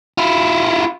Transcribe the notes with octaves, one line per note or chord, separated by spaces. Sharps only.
E4 F4